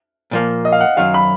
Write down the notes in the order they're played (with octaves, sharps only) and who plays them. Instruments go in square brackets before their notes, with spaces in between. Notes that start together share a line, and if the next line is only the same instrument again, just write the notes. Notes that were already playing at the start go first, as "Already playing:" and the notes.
[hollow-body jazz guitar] A#2 F3 A#3
[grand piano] D#5
F5
F#5
[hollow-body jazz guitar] F#2 D#3 F#3 [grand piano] F5
[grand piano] B5